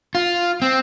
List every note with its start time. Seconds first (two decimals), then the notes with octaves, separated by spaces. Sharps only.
0.15 F4
0.62 C4